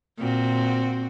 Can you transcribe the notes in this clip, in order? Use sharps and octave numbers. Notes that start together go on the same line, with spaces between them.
A#2 C4 F#4